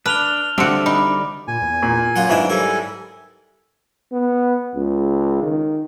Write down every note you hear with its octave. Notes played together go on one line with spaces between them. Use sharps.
D4 B4 F6 F7 G7
D3 G3 C4 D4 F#4 D5 E5
D#4 B5 D6
A#2 G#5
E2
A#2
F#2 F#3 F4 F#5
G#2 B3 D4 E4 C5
G3 A4 A#4 G#5
B3
C#2
D#3